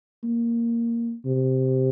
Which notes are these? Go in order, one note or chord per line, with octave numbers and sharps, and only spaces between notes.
A#3
C3